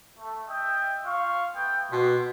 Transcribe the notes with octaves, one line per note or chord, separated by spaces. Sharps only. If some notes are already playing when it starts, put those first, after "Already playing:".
A3
D#5 E5 G5
F4 F5 C#6
A3 B3 G5
B2 G4 B4 C6